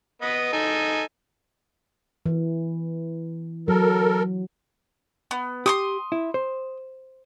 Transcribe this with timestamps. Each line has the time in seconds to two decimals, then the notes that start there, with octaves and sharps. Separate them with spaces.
0.22 B3 B4 D#5
0.53 D#4 A4 G#5
2.26 E3
3.68 F#3 A4 A#4
5.31 B3
5.66 G4 C6 C#6 D#6
6.12 E4
6.34 C5